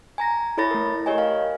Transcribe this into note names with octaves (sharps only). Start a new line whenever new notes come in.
G#5 A#5 A#6
E4 A4 C#5 B5 A6 A#6
A3 A#4
G4 A#4 C#5 D#5 G#5
F5